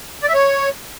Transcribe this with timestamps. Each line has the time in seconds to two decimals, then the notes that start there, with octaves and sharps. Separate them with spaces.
0.23 D5
0.29 E5
0.34 C#5